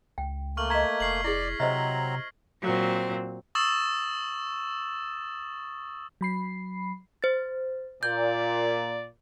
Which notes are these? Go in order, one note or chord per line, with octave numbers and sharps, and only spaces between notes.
C#2 G5
A3 A#3 C#6 F6 F#7
D#5 A#5 G#6 B6
F1 F6 C7 F#7
E4 G#4 D5 A#6 F#7
C3 F#3 C4 C5 D#5 E5 A#5 F6
A#2 F#3 C4
C#6 D#6 E6 A6 E7
F#3 B5 C7
C5 A6
A#2 D5 G6